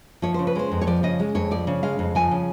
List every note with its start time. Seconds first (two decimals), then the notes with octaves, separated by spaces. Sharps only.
0.22 F3 C#5
0.34 C#3 C5
0.47 B4
0.55 G#3 C5
0.72 F2
0.81 C#5
0.87 F3 D5
1.03 C#3 D#5
1.20 G#3
1.35 F2 C#5
1.51 F3 D5
1.67 C#3
1.83 G#3 F5
1.99 F2
2.15 F3 G#5
2.31 C#3